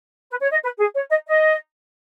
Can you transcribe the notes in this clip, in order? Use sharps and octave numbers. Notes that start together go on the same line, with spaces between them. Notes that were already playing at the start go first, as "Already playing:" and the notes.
B4
C#5
D#5
B4
G#4
C#5
D#5
D#5